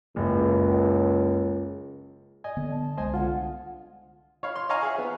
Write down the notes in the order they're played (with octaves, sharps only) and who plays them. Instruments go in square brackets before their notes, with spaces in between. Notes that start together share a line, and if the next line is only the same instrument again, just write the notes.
[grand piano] F#1 [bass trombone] C#2
[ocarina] D5 [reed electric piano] D#5 G#5
[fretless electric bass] D3 B3
[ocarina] A5
[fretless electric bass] C2 G#3 B3 [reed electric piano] C5 D#5 G#5
[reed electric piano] D3 F4 [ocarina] F#5
[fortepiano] C#5 F5 B5
C6
C#5 D#5 F5 G#5 A#5 C#6
G#4 E5 F#5
B3